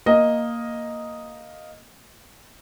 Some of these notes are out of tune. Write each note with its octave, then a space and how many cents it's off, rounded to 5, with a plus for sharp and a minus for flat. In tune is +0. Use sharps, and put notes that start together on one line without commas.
A#3 +0 D#5 +0